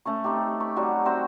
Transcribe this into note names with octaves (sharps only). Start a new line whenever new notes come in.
A3 C#4 C#6
C4 D#4 G4
B5 C#6
F#3 G3 C4 F#4
C4 F#4 C5 E5